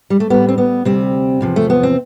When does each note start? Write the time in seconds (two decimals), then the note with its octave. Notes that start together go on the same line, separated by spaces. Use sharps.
0.10 G3
0.20 A3
0.30 A2 G3 B3
0.48 C4
0.58 B3
0.85 D2 C3 G3 C4
1.41 E2 C3 F3
1.56 A3
1.70 B3
1.83 C4